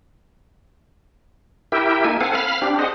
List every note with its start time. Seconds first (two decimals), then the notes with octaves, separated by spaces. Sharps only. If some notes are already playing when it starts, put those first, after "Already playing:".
1.72 E4 G4 A#4 E5 G5
2.05 A#3 D#4 A4 G#5
2.21 C4 A4 F5 F#5 G#5
2.35 F5 B5 F6
2.62 C4 D4 G4
2.79 G#4 C5 D#5 F#5